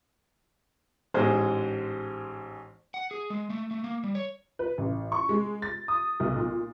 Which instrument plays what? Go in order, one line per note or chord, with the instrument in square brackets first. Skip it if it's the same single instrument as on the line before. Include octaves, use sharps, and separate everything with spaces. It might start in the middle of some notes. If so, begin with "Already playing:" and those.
[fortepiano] A1 G#2 G#3 C5
[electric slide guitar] F#5
G#4
G#3
A3
A3
A#3
G3
C#5
[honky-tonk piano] B4
A1
C#6
G#3
A6
D#6
B1
A#2